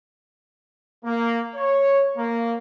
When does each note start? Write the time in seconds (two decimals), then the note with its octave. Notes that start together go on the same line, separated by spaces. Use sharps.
1.05 A#3
1.55 C#5
2.17 A#3